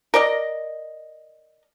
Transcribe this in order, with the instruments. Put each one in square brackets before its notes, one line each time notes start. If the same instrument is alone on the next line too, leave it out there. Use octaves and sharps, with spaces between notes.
[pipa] A#4 D5 D#5